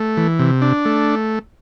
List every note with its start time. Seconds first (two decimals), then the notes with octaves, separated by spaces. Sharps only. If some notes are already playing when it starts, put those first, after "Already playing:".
Already playing: A3
0.17 E3
0.39 C3
0.62 D4
0.85 A3